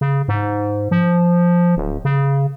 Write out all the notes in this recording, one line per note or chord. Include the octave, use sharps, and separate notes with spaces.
C#3
G#2
F3
D1
C#3